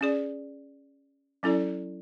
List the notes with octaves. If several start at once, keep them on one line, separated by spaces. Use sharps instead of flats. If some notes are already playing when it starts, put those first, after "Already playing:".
C#4 G#4 D5
F#3 C#4 E4 A4 D5